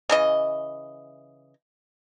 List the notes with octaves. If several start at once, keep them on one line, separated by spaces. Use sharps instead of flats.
C#3 E3 D#5